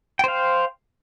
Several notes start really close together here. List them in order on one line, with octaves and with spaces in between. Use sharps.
G5 C5 F5